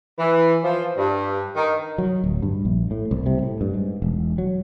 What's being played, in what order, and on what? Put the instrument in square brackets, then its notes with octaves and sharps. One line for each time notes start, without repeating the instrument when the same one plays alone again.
[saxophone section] E3
F3
G2
D#3
[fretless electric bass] F#3
D1
G2
A#1
A2
C2
C3
A2
G2
G#2
E1
F#3